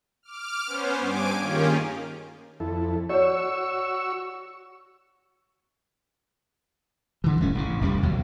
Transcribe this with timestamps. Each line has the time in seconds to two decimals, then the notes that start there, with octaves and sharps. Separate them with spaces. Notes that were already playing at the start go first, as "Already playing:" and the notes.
0.23 D6 F6
0.66 B3 C#4 C5
0.98 G2 G#5 D6 D7
1.40 D#3 A#3 C#4 F4 G4 G#4
2.60 F2 E4 A4
3.09 F#4 C#5 D5 C#6 E6
7.24 G2 D3 E3
7.40 D1 G2 A3 C#4
7.55 A1 C#3
7.81 F1 C#2 D3 G3
8.03 D2 B2 F#3